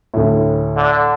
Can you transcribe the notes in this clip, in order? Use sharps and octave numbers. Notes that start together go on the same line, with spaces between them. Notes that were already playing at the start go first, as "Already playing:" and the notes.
D2 A2
D3